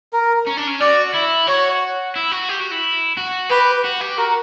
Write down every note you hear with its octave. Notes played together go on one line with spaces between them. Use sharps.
A#4
C#4
D4
C#4
F#4 D5
E4
F#4 C#5
E4
F#4
G4
F#4
E4
F#4
G4 B4
F#4
G4
F#4 A#4